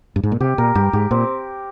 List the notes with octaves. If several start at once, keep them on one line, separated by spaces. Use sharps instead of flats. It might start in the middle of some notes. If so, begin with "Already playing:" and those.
G2
G#2
A#2
C3 G4
A#2 A#4
G2 G4
G#2 G4
A#2 C4